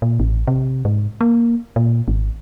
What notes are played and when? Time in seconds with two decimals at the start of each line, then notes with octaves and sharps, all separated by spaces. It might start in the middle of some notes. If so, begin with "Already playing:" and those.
0.02 A#2
0.20 A1
0.47 C3
0.85 G#2
1.21 A#3
1.76 A#2
2.08 G#1